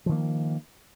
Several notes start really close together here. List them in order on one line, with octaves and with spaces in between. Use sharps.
F3 D#3 A#3